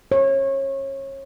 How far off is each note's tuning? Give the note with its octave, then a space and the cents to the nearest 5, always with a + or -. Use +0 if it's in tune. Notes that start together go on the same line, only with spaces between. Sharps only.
C#5 -30